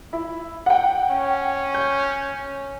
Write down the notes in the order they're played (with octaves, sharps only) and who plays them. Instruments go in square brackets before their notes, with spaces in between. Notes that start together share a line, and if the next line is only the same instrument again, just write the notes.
[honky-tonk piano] E4
F#5 G5
[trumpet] C#4
[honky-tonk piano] G6